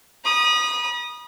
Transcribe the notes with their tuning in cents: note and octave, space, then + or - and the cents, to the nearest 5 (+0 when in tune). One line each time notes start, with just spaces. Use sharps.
B5 -40 D#6 -15